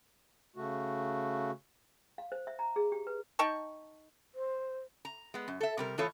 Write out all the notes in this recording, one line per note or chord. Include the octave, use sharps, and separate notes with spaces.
C#3 A3 F#4
F5
C5
E5
A#5
G#4
G4
B4
D#4 G5 A5 C#6
C5
A#5
G#3 B3
F#2
A4 E5
C3 G3 A#4
A2 E3 F4 A4 C#5 D#5